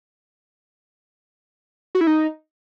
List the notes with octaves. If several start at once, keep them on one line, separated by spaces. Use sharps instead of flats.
F#4
E4
D#4